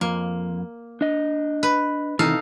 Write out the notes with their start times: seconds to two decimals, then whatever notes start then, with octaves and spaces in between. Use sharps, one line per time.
0.01 F2 A#3
1.01 D4 D#5
1.63 B4
2.19 C3 D#3 E3 D#4 A4 F5